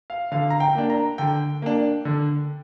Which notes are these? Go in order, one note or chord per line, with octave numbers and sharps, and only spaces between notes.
F5
D3 F5
A#5
G5
A#3 D4
A#5
D3 G5
A#3 D4
D3